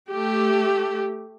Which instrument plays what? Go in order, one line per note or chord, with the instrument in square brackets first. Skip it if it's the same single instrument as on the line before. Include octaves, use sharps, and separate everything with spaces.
[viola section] A3 G4